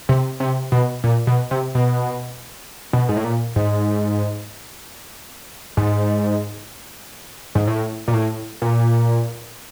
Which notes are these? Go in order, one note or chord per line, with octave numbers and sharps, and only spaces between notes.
C3
C3
B2
A#2
B2
C3
B2
B2
G#2
A2
A#2
G#2
G#2
G#2
A2
A#2
A2
A#2